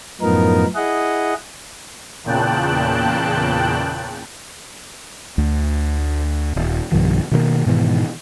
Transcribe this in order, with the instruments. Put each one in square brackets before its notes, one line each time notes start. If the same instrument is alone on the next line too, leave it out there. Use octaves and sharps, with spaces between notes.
[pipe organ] F#2 A2 F3 B3 D#4 A#4
E4 G#4 D#5 F#5
[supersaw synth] E2 A#2 C#3 G5 A5 F#6
[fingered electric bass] D2
D#1
B1 G2 D#3 F3
B2 D#3 G#3 A#3
G#2 B2 D#3 E3